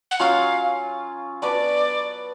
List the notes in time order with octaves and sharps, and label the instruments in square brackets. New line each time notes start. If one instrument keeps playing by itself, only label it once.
[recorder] F#5
[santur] F#3 C#4 F4 [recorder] F5
[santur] B3 D4 F#4 B4 [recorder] D5